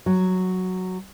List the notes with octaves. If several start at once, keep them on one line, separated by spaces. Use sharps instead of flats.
F#3